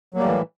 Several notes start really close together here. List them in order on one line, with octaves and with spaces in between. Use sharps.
F#3 A#3 G3 A2 E3